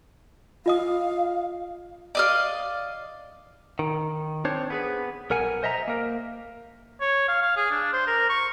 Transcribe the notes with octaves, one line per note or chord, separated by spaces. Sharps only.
F4 D#5 F5 D#6
D5 D#5 F5
D#3
C4 D4 C5 C#5
B3 G#4 B4
B1 A#4 F#5 G#5
C5 D#5 E5 A#5
A#3 A#4
C#5
F5
F5
G#4
D4
C5
A#4
C#6